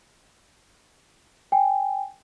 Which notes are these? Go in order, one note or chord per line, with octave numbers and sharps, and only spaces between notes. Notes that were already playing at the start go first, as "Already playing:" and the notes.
G5 G#5